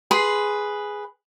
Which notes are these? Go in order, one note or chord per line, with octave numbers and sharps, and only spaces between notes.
G#4 B4 C6